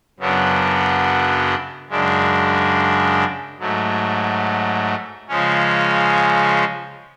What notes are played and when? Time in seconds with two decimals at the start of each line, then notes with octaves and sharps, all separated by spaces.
0.19 F#2 C#3 F#3 B3 D4
1.89 F#2 C#3 G#3 D4
3.59 G#2 F#3 A3
5.29 C#3 F3 G#3 C#4